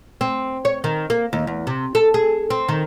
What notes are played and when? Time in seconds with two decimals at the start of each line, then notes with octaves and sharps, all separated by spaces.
0.21 C4
0.65 C#5
0.84 D#3
1.10 A#3
1.33 D#2
1.47 E2
1.67 C3
1.95 A4
2.14 G#4
2.50 C4
2.69 D#3